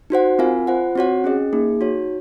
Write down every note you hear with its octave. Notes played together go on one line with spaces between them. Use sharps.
D#4 F#4 C5 F#5
C4 F4 A#4 F5 G#5
F4 C5 F#5
C4 F#4 C#5 F#5
C#4 G#4 D#5
A#3 D#4 G#4
D#4 F#4 C#5